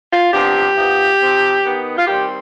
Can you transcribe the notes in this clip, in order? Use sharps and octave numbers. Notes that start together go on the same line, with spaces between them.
F4
C3 F3 B3 D4 G4
F3 B3 D#4
C3 F3 C4 D#4
D#3 B3 D#4
F4
D#3 G3 C4 G4